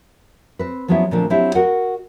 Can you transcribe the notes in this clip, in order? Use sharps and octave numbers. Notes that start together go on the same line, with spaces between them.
C4 B4
F3 F#3 G#3 B3 C#4 E4
A#2 D3 F3 A3 C4 D4
F#3 C4 D4 E4 G4
F#4 A#4 D#5 F#5